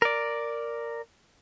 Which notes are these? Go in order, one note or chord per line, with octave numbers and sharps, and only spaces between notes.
A#4 D5